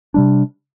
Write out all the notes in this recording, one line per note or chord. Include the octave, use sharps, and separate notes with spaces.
C3 G3 D4